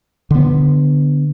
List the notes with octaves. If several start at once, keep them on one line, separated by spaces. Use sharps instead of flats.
D3 B3